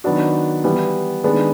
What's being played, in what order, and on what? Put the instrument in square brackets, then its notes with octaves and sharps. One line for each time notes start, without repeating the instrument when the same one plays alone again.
[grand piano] D#3 F#3 B3 D4 F#4
E3 G3 B3
D#3 G#3 B3 D4